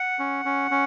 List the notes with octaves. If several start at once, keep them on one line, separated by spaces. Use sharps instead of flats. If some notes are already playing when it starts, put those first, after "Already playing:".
Already playing: F#5
C#4
C#4
C#4